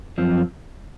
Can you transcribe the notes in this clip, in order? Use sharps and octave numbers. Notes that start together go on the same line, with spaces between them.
F#2 F3 C4